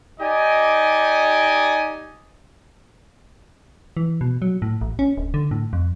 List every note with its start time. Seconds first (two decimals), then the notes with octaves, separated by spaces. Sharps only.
0.20 D#4 G4 D5 D#5 G#5
3.97 E3
4.21 B2
4.42 F#3
4.62 A2
4.81 A1
4.99 C#4
5.17 D1
5.34 D3
5.51 A2
5.73 F2